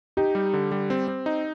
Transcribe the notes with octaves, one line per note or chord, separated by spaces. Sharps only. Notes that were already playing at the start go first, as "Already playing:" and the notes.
D#4 G4
G3
D3
G3
C4
C4
D#4